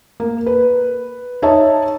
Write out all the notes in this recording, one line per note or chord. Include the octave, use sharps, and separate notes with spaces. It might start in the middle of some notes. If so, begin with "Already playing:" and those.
A#3
B4
D#4 C#5 E5 A5